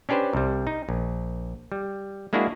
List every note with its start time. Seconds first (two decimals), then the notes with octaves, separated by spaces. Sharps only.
0.09 C#4 D4 G4 B4 C5
0.33 C2 G3
0.67 D#4
0.89 A#1
1.72 G3
2.33 G#3 A#3 D4 E4 F#4 G#4